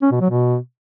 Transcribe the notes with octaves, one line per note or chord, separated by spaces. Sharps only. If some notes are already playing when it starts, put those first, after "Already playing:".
C#4
B2
F#3
B2